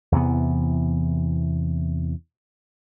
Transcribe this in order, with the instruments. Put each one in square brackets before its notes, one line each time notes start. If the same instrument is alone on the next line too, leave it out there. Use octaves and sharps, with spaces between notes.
[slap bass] E2 C3 E3 B3